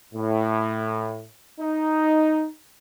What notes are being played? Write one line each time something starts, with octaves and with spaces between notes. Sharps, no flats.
A2
D#4